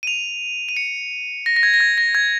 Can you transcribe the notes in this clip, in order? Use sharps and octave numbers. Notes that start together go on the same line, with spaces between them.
D#7
F7
D#7
C#7
A#6
A#6
G#6
A#6
G#6
A#6
G#6